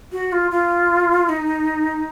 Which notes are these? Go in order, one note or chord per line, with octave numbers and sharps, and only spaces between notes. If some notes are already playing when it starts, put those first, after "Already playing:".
F#4
F4
F4
D#4